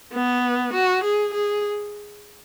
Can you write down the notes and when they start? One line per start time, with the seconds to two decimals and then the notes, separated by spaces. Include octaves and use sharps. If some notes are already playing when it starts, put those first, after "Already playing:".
0.13 B3
0.73 F#4
1.04 G#4
1.33 G#4